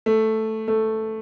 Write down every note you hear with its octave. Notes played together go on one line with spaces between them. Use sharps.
A3
A3